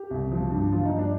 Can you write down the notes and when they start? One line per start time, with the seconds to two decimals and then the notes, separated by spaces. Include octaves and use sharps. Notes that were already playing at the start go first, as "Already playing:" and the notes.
Already playing: G4
0.11 C2
0.32 F3
0.51 G2
0.72 F3 F4
0.85 D#4
0.91 G2
0.98 D4